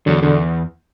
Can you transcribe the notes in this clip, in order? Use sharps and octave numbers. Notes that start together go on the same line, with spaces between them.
E2 D3 F#3
E2 B2 D3